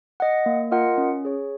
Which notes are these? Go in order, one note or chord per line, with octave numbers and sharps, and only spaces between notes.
D#5 F#5
A#3
F4 A#4 D#5 F#5
C#4
G#4 C#5